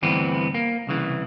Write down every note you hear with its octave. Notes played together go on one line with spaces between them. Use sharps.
D2 G2 E3 B3 C4
A#3
C2 C#3 E3